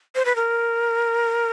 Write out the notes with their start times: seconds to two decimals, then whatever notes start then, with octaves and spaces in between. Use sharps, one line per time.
0.15 C5
0.25 B4
0.36 A#4